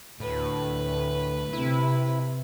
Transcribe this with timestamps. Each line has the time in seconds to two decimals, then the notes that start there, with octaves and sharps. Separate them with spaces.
0.20 D2 A2 B4
1.53 C3 E4